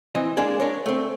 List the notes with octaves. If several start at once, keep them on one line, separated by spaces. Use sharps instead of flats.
E3 C4 D#5
G#3 A#3 D4 G#4
D4 A#4 C#5
A3 C4